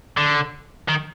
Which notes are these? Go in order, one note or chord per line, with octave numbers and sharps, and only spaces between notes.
D3
D#3